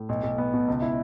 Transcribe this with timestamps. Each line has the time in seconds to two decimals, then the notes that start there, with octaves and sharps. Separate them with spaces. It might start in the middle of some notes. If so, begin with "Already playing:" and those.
Already playing: A2
0.09 B1
0.24 B1
0.38 B3
0.54 B2
0.68 C#2
0.82 E4